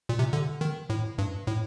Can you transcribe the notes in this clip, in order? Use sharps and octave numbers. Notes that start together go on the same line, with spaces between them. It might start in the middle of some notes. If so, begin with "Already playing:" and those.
A#2
C3
D3
D#3
A2
G2
A2